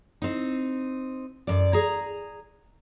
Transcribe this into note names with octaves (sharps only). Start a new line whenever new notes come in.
C4 D#4
F#2 D5
G#4 A#5